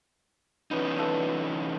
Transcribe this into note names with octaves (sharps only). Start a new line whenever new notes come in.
E3 B3 C#4 D#4
D4 F4 A4